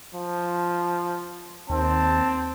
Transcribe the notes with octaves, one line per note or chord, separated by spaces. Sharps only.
F3
D#2 C4 A5